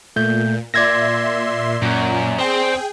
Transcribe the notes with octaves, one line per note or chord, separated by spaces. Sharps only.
A#2 A3 G6
A#2 D5 E5 C6 G#6 A#6
F#2 A#2
C4 G#4 G5